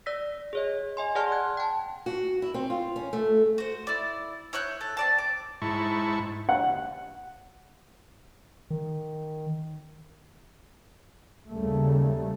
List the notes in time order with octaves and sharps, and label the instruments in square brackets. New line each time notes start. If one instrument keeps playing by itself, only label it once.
[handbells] D5 E6 A#6 B6
G#4 C#5 D#5
D#5 G#5 C6
G#4 D5 F#5 A5 C6 F6
F#6 G#6
G5 A5
[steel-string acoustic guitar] F#4
E4
C4
F4
C#4
A3
[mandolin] F#4 C5
E4 D5
E4 C#5 F#6 G6
A4
C4 D5 A5
D6
[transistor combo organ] G#2 E4 A5 C#6
[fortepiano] F#5
[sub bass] D#3
[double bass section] D#2 C#3 G3 A3